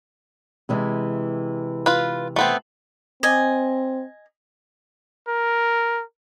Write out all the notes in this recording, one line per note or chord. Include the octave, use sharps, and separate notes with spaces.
C3 E3 G#3
F4 B4
A3 B3 C4
C4 D#5 G#5
A#4